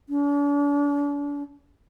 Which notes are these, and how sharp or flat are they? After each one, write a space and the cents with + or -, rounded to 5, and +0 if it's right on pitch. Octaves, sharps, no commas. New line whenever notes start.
D4 -40